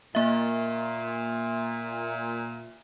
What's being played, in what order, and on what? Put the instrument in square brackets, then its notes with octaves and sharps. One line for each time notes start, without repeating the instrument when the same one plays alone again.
[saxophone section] A#2 [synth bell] A#3 E5